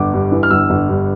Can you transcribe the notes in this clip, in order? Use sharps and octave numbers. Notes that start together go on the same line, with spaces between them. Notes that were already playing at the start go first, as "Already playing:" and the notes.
Already playing: G1 D6
G2
E3
F6
G1 E6
G1
G2